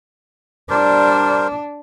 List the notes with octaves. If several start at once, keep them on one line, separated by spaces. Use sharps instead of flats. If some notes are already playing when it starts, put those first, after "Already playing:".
G3 D4 A#4 C5